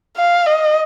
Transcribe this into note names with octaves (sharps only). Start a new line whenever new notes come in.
F5
D#5